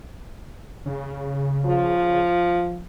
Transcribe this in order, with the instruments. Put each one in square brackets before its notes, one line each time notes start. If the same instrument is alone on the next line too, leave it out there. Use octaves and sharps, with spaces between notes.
[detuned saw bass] C#3
[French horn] F3